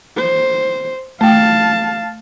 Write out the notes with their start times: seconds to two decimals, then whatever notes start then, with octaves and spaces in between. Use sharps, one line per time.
0.17 C5
1.21 A3 F5 G5 A5